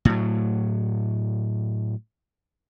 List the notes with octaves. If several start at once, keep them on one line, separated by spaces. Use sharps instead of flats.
A2 F#3